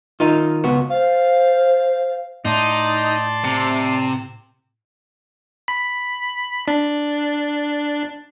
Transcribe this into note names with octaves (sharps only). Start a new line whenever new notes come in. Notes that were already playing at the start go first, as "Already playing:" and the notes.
D#3 D#4 F4
C#2 B3 F#4
C5 F5
A2 D#4 D5 A5 C6
C3
B5
D4